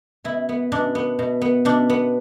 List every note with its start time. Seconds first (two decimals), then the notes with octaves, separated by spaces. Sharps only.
0.24 B2 E4
0.49 B3
0.72 B2 D4
0.95 B3
1.19 B2
1.42 B3
1.65 B2 D4
1.90 B3